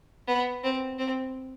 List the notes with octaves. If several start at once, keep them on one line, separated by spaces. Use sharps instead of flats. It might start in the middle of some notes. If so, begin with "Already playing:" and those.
B3
C4
C4